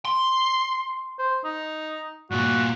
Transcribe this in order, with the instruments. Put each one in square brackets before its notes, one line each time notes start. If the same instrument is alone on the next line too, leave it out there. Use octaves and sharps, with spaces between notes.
[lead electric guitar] C6
[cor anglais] C5
D#4
[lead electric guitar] G2 A#2 [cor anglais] F#4